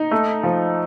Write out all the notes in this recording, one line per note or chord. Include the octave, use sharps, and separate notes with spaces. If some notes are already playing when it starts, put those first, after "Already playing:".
Already playing: D#4
A3
F3